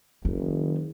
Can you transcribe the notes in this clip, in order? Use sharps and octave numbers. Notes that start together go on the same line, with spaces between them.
F#1 D#3